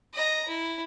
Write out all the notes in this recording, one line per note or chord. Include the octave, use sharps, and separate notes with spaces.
D#5 A#5
E4